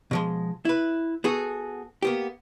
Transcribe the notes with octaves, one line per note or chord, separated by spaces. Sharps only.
B2 F3 G#3
E4 B4
B3 F#4 G#4 A4
A#3 B3 G4